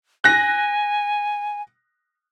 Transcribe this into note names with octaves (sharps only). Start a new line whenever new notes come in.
G#5 F#6 A#6